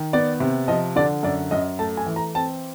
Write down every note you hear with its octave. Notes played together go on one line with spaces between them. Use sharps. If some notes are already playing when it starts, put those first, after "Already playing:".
Already playing: D#3
B3 D5
C3
F3 D#5
D3 D5
F#2 D5
F#2 D#5
A3 A5
G#5
E3
A#5
C4 A5